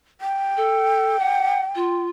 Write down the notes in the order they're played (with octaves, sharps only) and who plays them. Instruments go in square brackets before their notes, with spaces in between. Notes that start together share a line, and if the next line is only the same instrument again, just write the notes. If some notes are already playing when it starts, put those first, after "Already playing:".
[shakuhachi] G5
[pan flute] A4
F#5
F4